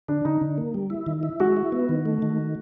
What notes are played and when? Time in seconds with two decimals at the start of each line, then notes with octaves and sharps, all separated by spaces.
0.08 D3 D4
0.25 D3 D#4
0.41 D3
0.58 A#3
0.74 G3
0.90 E4
1.06 D#3
1.23 E4
1.40 G#3 F#4
1.57 E4
1.72 B3
1.89 D#3
2.06 A3
2.22 D#3